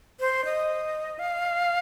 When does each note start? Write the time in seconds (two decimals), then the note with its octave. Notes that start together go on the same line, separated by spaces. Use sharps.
0.20 C5
0.45 D#5
1.19 F5